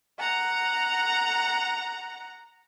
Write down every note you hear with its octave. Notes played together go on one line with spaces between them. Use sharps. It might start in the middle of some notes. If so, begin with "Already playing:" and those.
F#5 A#5